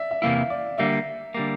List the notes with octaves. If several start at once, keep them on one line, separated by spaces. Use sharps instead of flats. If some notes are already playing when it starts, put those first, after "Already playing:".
Already playing: D5 E5
E5
E2 C3 F3 A#3 E4 F5
D5
D3 G3 A#3 E5
D3 G3 A#3